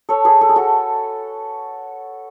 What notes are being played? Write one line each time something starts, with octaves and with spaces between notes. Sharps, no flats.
A4 C#5
G#4 B4
A4
G#4
F#4 A4